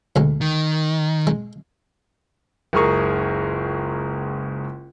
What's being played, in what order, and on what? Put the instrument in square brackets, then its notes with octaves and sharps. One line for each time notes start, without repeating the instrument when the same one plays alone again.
[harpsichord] D2 G#3
[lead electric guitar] D#3
[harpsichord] G#3
[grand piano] F#1 C#2 G#4 A#4 C#6